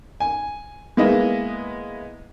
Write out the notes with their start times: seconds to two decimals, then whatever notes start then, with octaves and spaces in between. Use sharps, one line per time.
0.20 G#5
0.97 G#3 A#3 B3 E4 D#5 E5